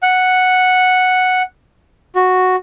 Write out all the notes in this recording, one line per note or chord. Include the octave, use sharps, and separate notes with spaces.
F#5
F#4